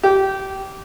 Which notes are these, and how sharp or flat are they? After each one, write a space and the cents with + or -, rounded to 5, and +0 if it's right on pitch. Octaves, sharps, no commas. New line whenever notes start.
G4 -20